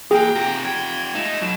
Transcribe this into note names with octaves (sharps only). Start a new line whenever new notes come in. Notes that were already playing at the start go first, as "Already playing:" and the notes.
E2 F#3 A#3 G#4 G5
C3 F4 G4 A#5
G5 G#6
G#3 A3 D#4 E7
B1 B2 F#3